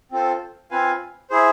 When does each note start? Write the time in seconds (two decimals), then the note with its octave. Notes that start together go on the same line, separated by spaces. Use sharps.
0.11 C4 F4 A4 C5
0.71 C4 F4 B4 F5 G#5
1.30 E4 G#4 C5